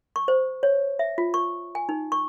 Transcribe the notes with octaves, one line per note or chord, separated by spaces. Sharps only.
C#6
C5
C#5
E5
F4
C#6
G#5
D#4
C#6